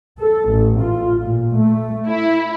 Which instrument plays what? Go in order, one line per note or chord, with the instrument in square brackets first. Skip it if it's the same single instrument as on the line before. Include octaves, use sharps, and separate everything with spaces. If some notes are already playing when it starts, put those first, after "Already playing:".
[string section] A4
A1
F4
A#2
A3
E4